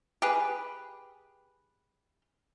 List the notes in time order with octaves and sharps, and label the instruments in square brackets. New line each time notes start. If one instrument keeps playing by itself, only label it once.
[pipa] G4 G#4 B4